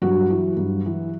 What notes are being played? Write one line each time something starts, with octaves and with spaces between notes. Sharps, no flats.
G2 F#3 F#4
E3
G2
E3